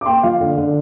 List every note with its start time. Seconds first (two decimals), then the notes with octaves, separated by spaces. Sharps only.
0.01 D6
0.06 A#3 G5 C6
0.23 F3 F5
0.40 D3
0.58 D3